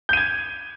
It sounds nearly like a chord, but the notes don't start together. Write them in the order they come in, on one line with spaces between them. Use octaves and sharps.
G6 D#7 G#6